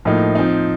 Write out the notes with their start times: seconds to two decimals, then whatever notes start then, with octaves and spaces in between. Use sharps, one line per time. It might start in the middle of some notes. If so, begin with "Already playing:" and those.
0.05 A2 F3 A#3 D#4
0.35 F3 C4 D#4